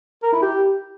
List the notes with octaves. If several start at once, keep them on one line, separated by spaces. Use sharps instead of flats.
A#4
E4
G4